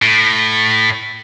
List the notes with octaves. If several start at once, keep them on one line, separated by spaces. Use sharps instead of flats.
A2